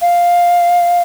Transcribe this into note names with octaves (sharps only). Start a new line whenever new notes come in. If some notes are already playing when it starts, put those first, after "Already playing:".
F5